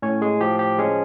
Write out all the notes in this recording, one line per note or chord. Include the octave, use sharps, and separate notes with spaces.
A2 C#4 C#5
G#3 G#4
F3 G4
G4
G#3 C#4 G#4